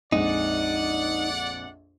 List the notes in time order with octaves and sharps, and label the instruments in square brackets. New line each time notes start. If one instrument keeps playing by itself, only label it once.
[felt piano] A#1 F2 G#3 [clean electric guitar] D#4 [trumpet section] D5 F#5